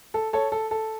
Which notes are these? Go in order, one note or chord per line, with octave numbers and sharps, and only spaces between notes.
A4
A4 C#5
A4
A4